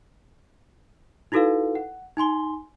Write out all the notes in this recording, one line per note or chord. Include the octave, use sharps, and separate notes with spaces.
D#4 E4 F#4 A4 B4 F5
F#5
D#4 G#5 C6 G7